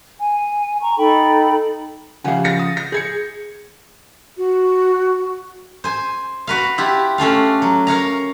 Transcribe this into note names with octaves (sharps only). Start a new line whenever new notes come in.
G#5
A#5 C#6
D#4 A4 G5 B5
C#3 F3 G4 F5 F#5 G#5
A6 A#6 C#7
D#6
A#6
G#4 G6 G#6 C#7
F#4
C5 G#5
F#4 B4 F5
E4 F4 G4
A3 C#4 D4 F5
F#3
A#4 C#5 F5 A#5